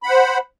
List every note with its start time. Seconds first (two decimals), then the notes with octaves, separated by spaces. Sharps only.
0.03 B5
0.06 F#5
0.09 C5